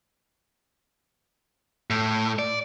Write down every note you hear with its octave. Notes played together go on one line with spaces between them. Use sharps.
A2
D5